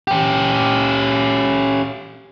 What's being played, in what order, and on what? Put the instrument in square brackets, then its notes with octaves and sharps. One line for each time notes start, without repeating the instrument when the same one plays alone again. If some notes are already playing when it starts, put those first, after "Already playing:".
[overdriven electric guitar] C#4 G4